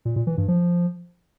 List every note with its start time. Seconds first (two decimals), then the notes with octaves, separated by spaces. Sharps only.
0.05 A#2
0.16 A#2
0.27 E3
0.37 G2
0.48 F3